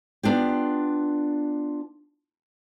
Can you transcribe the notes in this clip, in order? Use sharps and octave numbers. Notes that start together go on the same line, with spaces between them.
B3 D4 F4 G4